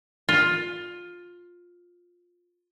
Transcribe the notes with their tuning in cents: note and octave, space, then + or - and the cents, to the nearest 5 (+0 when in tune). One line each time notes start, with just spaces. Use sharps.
F4 +15